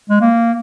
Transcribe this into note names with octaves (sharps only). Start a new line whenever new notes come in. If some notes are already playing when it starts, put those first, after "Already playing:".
G#3
A#3